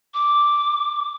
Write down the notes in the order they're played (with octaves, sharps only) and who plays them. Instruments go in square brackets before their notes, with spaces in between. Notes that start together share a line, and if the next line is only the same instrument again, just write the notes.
[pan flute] D6